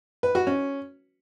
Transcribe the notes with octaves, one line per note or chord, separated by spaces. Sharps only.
B4
F#4
C#4